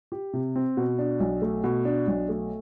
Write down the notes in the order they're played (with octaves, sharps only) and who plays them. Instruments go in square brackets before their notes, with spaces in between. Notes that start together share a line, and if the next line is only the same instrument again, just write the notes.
[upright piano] G4
C3
C4
B2
D4
B1
A3
B2
D4
B1
A3